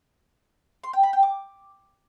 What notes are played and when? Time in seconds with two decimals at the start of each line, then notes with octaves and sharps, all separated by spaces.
0.84 C6
0.93 G5
1.03 B5
1.13 G5
1.23 D6